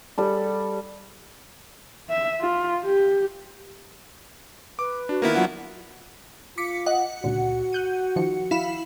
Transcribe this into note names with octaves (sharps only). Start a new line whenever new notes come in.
G3 A4
E5
F4
G4
B4 D6
D4 F#4
D#3 A#3 B3 E4 A#4
F#3 D4 F4 F#5
F4 D6 B6 C#7
D#5 F#5
C#2 A#2 D3 F#4
F#6 G6 D#7
D#3 F3 C#7
E4 F5 B5